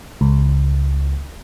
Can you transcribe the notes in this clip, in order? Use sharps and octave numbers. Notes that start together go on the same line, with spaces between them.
C#2